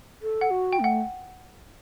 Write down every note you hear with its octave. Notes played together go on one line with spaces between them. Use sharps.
A4
F#5
F#4
G5
A3 F#5